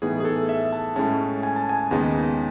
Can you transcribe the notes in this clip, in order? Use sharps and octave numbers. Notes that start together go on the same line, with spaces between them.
A2 E3 B3 D#4 G#4
G#4
A4
E5
A5
A2 G#3 C#4 A5
G#5
A5
G#5
D#2 C#3 G#3 B3 D#4